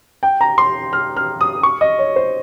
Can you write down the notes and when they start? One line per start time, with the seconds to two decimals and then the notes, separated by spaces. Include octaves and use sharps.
0.23 G5
0.41 A#5
0.58 C6
0.93 F6
1.17 F6
1.41 D#6
1.63 C#6
1.81 D#5
1.99 C#5
2.16 C5